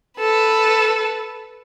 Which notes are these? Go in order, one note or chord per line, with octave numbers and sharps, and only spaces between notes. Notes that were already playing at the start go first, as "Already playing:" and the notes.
A4 B4